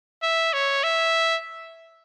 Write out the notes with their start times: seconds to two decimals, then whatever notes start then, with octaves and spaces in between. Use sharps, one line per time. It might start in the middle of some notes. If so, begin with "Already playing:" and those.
0.23 E5
0.53 C#5
0.83 E5